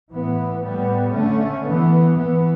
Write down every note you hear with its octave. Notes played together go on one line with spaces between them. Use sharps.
A2 E3 B3
A2 G3 B3
D3 A3 C#4
E3 B3
E3 B3